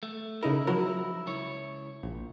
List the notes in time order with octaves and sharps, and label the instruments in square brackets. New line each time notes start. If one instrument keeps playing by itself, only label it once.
[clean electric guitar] A3
[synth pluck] C#3 D#4 A#4 [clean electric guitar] E4
[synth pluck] F3 F#3 A#4 [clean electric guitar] E4
[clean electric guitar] C#2 E4 C#5
[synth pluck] A#1